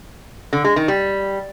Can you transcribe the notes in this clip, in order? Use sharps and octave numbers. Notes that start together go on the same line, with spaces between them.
D3
G#3
D#3
G3